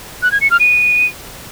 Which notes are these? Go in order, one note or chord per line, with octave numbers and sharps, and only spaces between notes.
F#6
G#6
C#7
F6
D#7